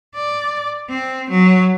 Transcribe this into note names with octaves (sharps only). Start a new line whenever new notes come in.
D5
C4
F#3